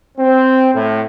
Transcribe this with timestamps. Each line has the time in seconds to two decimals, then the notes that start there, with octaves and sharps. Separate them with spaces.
0.18 C4
0.74 A2